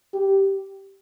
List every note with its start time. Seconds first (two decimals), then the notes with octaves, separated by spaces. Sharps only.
0.14 G4